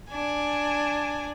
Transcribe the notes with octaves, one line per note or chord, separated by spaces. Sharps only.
D4 G#5